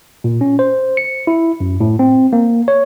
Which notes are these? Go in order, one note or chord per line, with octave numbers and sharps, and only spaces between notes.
A#2
C#4
C5
C#7
E4
F#2
A2
C4
A#3
C#5